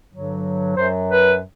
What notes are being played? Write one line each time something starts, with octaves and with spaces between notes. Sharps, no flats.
G2 D3 F#3
F#2 F#3 C5
B4